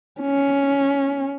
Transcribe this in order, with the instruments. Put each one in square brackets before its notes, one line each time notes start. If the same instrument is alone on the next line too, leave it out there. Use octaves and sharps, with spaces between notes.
[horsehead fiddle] C#4